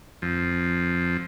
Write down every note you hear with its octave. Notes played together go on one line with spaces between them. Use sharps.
F2